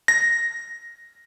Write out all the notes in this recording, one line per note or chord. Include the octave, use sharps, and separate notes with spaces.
A#6